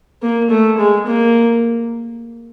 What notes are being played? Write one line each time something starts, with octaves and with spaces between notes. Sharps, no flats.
A#3
A3
G#3
A#3